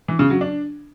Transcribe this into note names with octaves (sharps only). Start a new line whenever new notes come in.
E3
C#3
F#3
D4